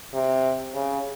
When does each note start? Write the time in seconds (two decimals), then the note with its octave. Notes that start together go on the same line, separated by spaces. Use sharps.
0.14 C3
0.74 C#3